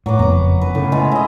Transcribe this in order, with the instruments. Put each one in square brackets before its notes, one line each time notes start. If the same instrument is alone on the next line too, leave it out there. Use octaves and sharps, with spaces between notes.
[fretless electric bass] A2 [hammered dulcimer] F#3 B4 D6
[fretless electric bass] F#1 F2 B3 [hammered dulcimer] B4 A#5
[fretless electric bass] F#2 [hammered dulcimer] B4
[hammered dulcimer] A2 [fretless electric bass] C#3
[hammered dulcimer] B2 G#3 E5
E4 D#5